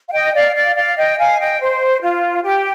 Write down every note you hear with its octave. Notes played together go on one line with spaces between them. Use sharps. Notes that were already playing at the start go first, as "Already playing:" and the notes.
F5
D#5 G5
D5 F5
D5 F5
D5 F5
D#5 G5
F5 G#5
D#5 G5
C5
F4
G4